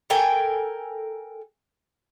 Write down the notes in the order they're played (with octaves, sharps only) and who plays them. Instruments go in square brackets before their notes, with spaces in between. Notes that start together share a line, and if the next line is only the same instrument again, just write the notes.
[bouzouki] A4 A#4 G5 G#5